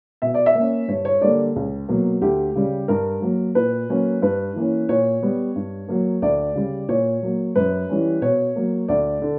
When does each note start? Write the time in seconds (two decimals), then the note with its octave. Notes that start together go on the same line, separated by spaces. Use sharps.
0.22 B2 E5
0.34 D5
0.46 E5
0.55 A#3 C#4
0.88 G2 C#5
1.05 C#5
1.21 D3 G3 A#3 D5
1.56 C#2
1.89 B2 F#3 A#3
2.22 D2 G4
2.55 C#3 G3
2.88 G2 A#4
3.22 F#3 A#3
3.55 A#2 B4
3.89 F#3 A#3 C#4
4.22 G2 B4
4.56 E3 A#3 C#4
4.89 A#2 C#5
5.23 G3 B3
5.55 G2
5.89 F#3 A#3
6.22 D2 D5
6.55 C#3 G3
6.89 A#2 C#5
7.23 F#3 A#3
7.55 F#2 B4
7.89 E3 G3 C#4
8.22 B2 C#5
8.56 F#3 A#3
8.88 D2 D5
9.22 D3